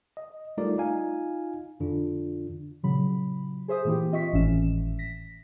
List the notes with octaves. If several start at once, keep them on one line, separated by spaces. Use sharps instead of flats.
D#5
G3 A3 D#4 F4 A#4 D5
D#4 F4 F5 G#5
F2 D3 D4 F4
A#2 C#3 F#3 B5
G#4 C5 E5 D#6
A#2 E3 A#3 E4 G4
C4 F4 D#5 E5 C#6 B6
G#1 A2 E3 C#4 E5 E7
A#6 B6